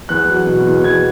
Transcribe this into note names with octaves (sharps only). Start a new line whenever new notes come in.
E2 F#6
F#3
B2
E2
E2 G#6